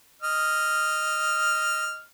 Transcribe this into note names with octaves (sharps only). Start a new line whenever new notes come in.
D#5 F6